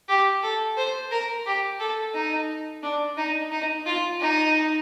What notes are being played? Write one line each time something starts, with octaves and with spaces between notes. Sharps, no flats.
G4
A4
C5
A#4
G4
A4
D#4
D4
D#4
D#4
F4
D#4